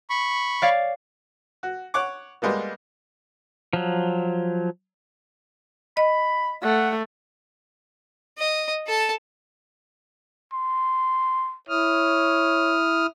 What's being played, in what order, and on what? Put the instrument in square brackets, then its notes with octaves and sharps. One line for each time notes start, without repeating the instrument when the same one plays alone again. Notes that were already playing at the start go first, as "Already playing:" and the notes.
[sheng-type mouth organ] B5 C#6
[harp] C#5 D5 F5
[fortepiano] F#4
C#5 F#5 C#6 D6
G3 G#3 A#3 B3
[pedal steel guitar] F3 F#3
[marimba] D#5 [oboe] B5
[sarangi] A3 [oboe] F#5
[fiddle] D#5
A4 A5
[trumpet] C6
[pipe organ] E4 D#6 F6 [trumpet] C#5